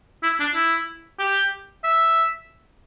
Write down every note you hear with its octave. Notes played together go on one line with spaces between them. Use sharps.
E4
D4
E4
G4
E5